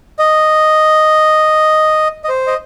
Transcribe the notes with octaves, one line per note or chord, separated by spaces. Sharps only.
D#5
D#5
C5
D#5